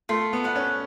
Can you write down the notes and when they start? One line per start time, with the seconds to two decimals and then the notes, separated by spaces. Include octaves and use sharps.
0.09 A3 F4
0.33 B3
0.44 B4 D5 F#5
0.56 C#4